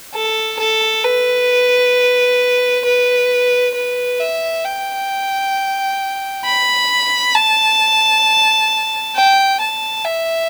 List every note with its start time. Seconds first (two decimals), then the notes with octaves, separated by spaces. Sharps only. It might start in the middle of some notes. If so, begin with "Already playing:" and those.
0.14 A4
0.59 A4
1.04 B4
2.85 B4
3.74 B4
4.20 E5
4.65 G5
6.45 B5
7.35 A5
9.15 G5
9.60 A5
10.05 E5